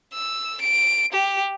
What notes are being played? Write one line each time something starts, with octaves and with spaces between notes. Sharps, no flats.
E6
D7
G4